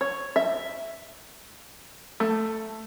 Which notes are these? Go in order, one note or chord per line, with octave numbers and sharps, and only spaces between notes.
C#5
E5
A3